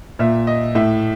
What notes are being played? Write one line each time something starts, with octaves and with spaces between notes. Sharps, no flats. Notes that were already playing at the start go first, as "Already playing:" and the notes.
A#2 E5
D#5
A2 E5